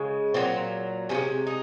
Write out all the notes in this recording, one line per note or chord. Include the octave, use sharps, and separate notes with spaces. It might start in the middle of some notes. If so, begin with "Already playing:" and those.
Already playing: C#3 G#3
A#2 F#3 C4
C3 F3 C#4
G#3
D#4